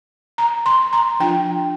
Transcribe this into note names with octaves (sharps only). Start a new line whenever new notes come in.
A#5
C6
A#5
F3 D4 F4 G5